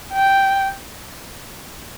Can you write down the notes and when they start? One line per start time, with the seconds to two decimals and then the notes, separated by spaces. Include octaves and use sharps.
0.13 G5